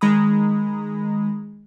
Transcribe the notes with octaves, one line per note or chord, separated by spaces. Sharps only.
D#3 G#3 A#5 B5 D#6